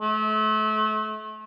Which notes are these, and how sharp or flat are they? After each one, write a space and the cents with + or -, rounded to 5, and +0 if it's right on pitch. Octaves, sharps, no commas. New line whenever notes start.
A3 -35